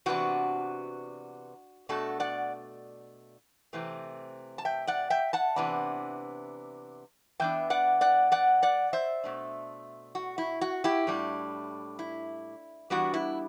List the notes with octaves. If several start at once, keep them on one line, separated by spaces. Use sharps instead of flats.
C3 E3 B3 D4 F#4
B2 A3 D4 F#4 A4
D5 F#5
C3 E3 A3 C4
A5
E5 G5
D5 F#5
E5 G5
F#5 A5
C3 E3 B3 D4
E3 B3 D4 E5 G5
D5 F#5
D5 F#5
D5 F#5
D5 F#5
C5 E5
B2 A3 D4
F#4
E4
F#4
E4 G4
A2 G3 D4
E4
E3 G3 B3 D4 F#4
E4